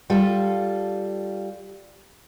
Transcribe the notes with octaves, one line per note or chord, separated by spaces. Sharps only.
G3 F4 A4